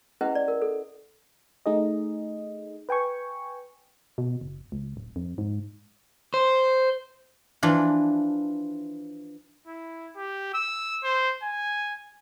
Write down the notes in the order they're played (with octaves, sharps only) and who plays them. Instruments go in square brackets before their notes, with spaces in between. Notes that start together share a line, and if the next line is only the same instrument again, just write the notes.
[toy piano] C#4 E4 G#4 B4 D#5 F#5
D5
A#4
A4
[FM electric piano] A3 D#4 G#4 D#5
B4 G5 G#5 C#6
[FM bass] B2
F#1
C#2
D1
F2
G#2
[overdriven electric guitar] C5
[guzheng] E3 F3 D4
[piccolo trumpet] E4
G4
E6
C5
G#5